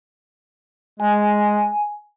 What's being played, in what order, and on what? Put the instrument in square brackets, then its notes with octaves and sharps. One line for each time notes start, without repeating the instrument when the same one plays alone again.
[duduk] G#3 [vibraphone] G#5